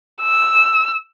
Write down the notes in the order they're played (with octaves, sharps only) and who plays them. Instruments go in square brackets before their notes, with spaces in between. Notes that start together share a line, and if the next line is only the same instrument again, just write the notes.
[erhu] E6